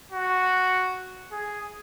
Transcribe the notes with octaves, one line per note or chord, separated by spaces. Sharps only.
F#4
G#4